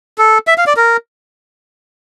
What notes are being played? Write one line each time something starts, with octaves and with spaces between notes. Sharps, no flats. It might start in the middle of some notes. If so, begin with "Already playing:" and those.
A4
E5
F5
D5
A#4